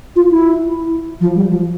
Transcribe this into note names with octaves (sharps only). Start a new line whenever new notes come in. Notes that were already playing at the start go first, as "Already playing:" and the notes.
F4
E4
F3
G3
F3